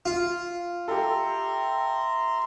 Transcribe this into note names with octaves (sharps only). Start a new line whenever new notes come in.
F4
G4 A4 E5 A#5 C6